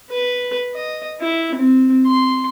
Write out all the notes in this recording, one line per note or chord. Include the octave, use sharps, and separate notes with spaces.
B4
D#5
E4
C4
C6